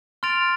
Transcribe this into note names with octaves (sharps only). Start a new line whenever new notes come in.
C6 F6 A6 D7 F7